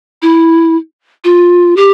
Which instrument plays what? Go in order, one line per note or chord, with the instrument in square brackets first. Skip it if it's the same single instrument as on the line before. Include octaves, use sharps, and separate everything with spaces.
[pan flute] E4
F4
G4